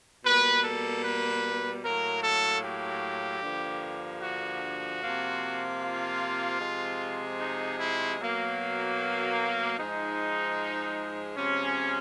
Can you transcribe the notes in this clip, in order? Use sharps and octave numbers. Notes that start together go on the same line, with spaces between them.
B2 G3 A#3 B4
A4
B4
A2 F#3 A#3 A#4
A4
G4
G2 D3 F3 A#3
F#4
C3 F3 A#3
F4
C3 F3 G#3
D#4
E4
B2 F#3 A#3
G#2 F3 G#3 D#4
C3 F3 G#3 C#4